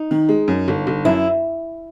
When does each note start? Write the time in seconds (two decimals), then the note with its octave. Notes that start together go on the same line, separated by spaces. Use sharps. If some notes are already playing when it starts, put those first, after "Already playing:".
Already playing: D#4
0.11 D#3
0.29 G#3
0.48 F#2
0.68 G1
0.87 G1
1.05 F#2 E4